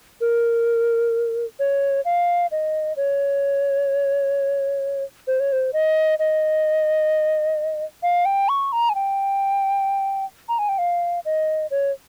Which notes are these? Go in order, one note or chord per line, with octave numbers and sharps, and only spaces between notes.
A#4
C#5
F5
D#5
C#5
C5
C#5
C5
D#5
D#5
F5
G5
C#6
A#5
G#5
G5
A#5
G#5
G5
F5
D#5
C#5